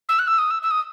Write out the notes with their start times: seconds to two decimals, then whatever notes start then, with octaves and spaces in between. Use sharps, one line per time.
0.09 E6
0.19 F#6
0.27 E6
0.38 D#6
0.50 E6
0.62 E6
0.71 D#6